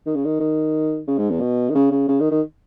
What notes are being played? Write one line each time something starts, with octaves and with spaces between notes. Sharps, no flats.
D#3
C#3
D#3
D#3
C#3
G#2
E2
B2
D#3
C#3
C#3
C#3
D#3
D#3